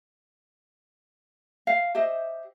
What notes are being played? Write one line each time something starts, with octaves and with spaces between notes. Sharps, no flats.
F5
G4 C5 D#5 E5